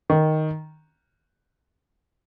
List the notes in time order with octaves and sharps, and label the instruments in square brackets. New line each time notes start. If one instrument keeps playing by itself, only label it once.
[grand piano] D#3